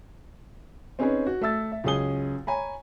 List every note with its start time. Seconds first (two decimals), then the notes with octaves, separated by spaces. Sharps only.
0.99 C4 C#4 D#4 G#4 B4 C#5
1.27 F#4
1.42 A3 E5 E6 A6
1.72 E5
1.84 C#2 F#2 C#4 G#4 D#6 G7
2.47 C#5 G#5 A#5 B5